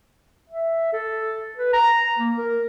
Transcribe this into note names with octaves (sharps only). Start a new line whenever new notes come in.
E5
A4
B4
A#5
A#3
A#4